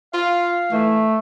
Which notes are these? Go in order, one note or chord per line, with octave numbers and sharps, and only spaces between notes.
F4 F5
E3 A3